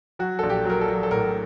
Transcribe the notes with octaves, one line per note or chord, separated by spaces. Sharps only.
F#3 F#4
A#1 A4
G4
F#3 A#4
A4
F#3
A4
A2 A#4